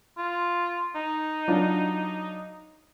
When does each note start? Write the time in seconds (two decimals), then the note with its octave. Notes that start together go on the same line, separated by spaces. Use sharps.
0.18 F4
0.95 D#4
1.48 F#3 D4 F4